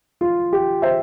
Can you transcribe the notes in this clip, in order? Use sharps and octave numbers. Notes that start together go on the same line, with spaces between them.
F4
G4
C5 E5